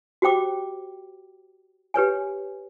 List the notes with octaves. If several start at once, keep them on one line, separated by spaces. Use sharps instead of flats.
F#4 G4 C5 G5 D6
G4 B4 C#5 G#5